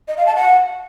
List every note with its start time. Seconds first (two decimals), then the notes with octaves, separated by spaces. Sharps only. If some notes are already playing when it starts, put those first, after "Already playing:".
0.08 D#5
0.17 F5
0.26 A5
0.36 F#5